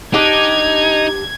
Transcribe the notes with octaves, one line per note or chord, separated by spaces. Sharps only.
D4 D#4 G4 G5 G#6